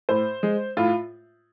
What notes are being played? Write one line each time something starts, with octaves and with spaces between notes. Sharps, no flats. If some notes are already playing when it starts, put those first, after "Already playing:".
A2 C5
G#3
A2 F4